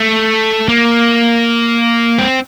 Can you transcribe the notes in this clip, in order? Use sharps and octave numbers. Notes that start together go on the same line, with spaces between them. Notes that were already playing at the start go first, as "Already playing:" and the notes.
Already playing: A3
A#3
C4